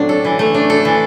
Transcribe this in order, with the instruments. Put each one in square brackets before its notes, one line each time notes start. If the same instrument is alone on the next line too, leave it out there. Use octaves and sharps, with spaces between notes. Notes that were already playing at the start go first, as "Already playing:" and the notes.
Already playing: [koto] A2 F#3 C4 D4
A4
E3
A3
D4
A4
E3